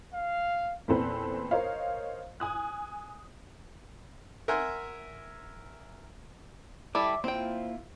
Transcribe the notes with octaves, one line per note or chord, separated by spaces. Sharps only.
F5
E2 A#2 C4 A4 B4
A#4 C5 C#5 D#5 F5
G#5 D#6 F#6
A#4 E5 F#5 G#5 C6
G3 E4 A4 E5 D6
A#3 C4 E4 F4 G5